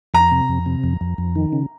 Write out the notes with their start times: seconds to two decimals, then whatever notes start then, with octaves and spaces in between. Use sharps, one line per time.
0.14 F2 A#5
0.31 C3
0.49 F2
0.66 C3
0.84 F2
1.01 F2
1.18 F2
1.36 D#3
1.53 C#3